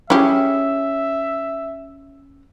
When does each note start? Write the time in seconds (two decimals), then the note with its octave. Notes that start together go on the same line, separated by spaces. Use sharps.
0.10 C#4 E4 G4 G#4 E5